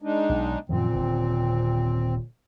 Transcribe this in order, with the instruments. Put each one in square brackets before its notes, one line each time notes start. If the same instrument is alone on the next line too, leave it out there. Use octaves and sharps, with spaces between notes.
[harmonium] G#3 D4 D#4
[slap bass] B1
[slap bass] F#2 D#3 F3 [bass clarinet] A#2 [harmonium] C4
[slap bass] D#1 D3